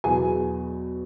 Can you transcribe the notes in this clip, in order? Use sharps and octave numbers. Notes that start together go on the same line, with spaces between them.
E2 B2 F#3 B3 G#4 G#5